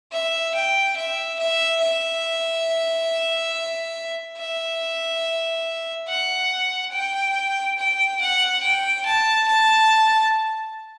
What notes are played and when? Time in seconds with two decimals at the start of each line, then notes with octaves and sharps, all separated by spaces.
0.12 E5
0.55 G5
0.97 E5
1.40 E5
1.82 E5
4.38 E5
6.08 F#5
6.93 G5
7.79 G5
8.21 F#5
8.64 G5
9.06 A5
9.48 A5